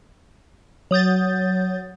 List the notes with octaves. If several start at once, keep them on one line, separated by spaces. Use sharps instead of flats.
F#3 D#6 G6 A6